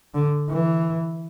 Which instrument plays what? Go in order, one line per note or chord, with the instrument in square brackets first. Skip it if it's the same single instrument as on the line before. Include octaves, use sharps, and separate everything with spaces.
[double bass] D3
E3